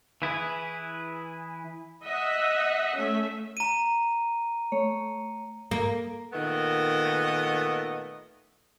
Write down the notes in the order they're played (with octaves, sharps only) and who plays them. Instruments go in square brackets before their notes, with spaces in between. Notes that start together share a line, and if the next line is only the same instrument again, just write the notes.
[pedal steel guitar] E3 E4 G#4 B4
[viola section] D#5 E5 F#5
A3 C#4 E5
[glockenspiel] A#5 D#7
[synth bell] A3 C#5
[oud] A#3
[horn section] A#2 D#3 A3 B3 D#5